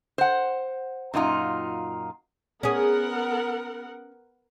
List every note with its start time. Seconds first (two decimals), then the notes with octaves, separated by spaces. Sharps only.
0.18 C5 F#5
1.14 F#2 A#2 D#4 F4
2.63 B3 C#4 G#4 A#4 F#5